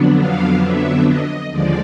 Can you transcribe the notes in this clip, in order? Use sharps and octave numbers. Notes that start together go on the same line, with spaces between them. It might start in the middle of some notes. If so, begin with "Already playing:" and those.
Already playing: F2 D3 F#3 B3 D4
F5
E5
D#5
D#2 D3 F3 G#3 D5